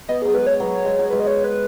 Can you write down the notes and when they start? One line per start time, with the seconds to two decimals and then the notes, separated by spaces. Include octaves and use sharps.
0.09 B3 D#5
0.22 F#3 B3 G#4
0.34 G#3 B4
0.47 C#5
0.60 F#3 B3
0.85 G#3
0.99 F#3
1.10 G#3 B4
1.20 D#5
1.27 C#5
1.44 B4